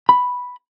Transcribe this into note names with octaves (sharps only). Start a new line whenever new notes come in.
B5